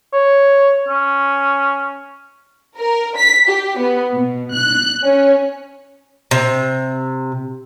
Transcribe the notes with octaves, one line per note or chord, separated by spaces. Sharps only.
C#5
C#4
A#4
B6
G4
B3
B2
F#6
C#4
C3